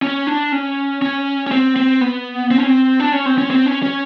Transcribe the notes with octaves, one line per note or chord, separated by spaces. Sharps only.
C#4
D4
C#4
C#4
C#4
C4
C4
B3
C4
C#4
C4
D4
C#4
C4
C#4
C4
C#4
C#4